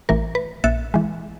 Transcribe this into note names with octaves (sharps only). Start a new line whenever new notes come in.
A1 E3 A#4
B4
A#1 E5 F#6 A6 C#7
E3 G#3